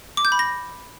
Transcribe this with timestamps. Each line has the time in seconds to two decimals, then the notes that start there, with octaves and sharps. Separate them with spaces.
0.17 D6
0.25 G6
0.32 B5
0.39 A#6